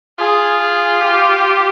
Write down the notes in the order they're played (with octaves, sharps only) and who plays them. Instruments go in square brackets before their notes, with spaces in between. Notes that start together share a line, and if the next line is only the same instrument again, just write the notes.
[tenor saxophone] F4 [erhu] G#4
[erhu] G#4
G4